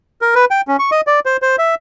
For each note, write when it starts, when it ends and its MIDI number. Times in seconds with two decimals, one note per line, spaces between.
0.22 0.35 70
0.35 0.45 71
0.51 0.61 79
0.68 0.77 61
0.79 0.90 85
0.92 1.01 75
1.07 1.20 74
1.26 1.37 72
1.42 1.56 72
1.59 1.75 76